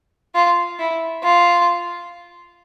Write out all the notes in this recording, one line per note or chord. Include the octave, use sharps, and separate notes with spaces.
F4
E4
F4